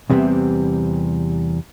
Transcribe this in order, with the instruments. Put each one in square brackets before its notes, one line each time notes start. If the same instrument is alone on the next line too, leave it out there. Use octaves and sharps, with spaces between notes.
[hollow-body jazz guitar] E2 C3 G3 B3 C4